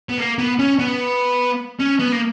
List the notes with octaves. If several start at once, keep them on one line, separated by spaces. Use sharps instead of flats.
B3
A#3
B3
C#4
B3
C#4
B3
A#3